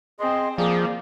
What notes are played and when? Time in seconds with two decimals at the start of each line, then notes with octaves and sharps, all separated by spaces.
0.20 C4 G#4 D#5 C6
0.58 F3 A#3 G#4 D5